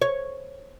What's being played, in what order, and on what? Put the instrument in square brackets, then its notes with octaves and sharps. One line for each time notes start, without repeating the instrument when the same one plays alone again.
[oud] C#5